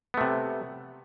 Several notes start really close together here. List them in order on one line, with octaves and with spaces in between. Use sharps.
B3 A3 C3